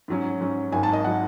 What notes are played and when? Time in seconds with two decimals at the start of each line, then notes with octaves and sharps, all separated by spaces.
0.08 G#2 F#3 C#4
0.40 G#2 F#3 C#4
0.72 G#1 G#2 D#3 F#3 G#5
0.83 A5
0.93 D#5
1.04 D#3 F#3 F#5